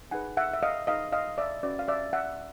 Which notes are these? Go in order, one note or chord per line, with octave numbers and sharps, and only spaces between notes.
D#4 G#4 B4 F#5 G#5
E5 F#5
E5
D#5 F5
D#4 G#4 B4 D#5 F5
D#5 F5
D5 E5
C#4 F#4 B4 D5
F5
D5 E5
E5 F#5